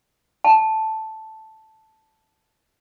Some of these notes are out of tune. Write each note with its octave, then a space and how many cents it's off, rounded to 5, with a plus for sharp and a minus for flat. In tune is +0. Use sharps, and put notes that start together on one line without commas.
A5 -5